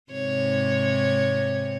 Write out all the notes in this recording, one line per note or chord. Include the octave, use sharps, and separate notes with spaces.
G#2 C3 C#5